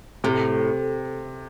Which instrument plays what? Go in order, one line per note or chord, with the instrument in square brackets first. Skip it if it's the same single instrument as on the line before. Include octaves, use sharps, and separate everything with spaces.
[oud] A2 [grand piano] C3